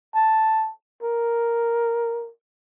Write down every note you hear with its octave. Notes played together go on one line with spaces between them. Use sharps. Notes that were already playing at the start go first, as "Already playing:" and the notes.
A5
A#4